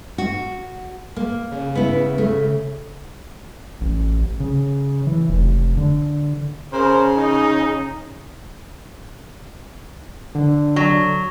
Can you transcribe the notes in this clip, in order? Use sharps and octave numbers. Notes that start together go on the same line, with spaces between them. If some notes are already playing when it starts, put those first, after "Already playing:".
F#4
A#3
C#3
B3 E4
A3
A1
C#3
E3
F1
D3
C#3 A#4 C5
D#4
D3
F#3